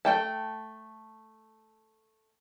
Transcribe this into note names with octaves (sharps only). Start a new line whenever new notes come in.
A3 G5 A5